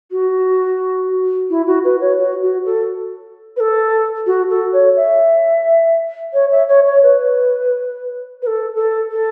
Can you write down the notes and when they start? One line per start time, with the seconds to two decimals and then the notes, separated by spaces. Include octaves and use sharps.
0.11 F#4
1.50 E4
1.67 F#4
1.84 B4
2.01 C#5
2.18 F#4
2.42 F#4
2.65 A4
3.56 B4
3.60 A4
4.26 F#4
4.50 A4
4.73 C#5
4.96 E5
6.33 C#5
6.51 E5
6.68 C#5
6.86 C#5
7.03 B4
8.42 B4
8.47 A4
8.75 A4
9.11 A4